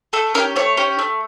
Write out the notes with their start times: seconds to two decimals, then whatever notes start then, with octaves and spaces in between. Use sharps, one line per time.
0.13 A3 A4
0.34 C#4 A#4
0.39 G4
0.56 A3 C#5
0.77 C#4 G4
0.99 A3